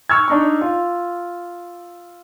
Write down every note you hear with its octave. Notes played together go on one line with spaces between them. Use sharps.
C#6 E6 F6 G#6
D4 D#4 C#6
F4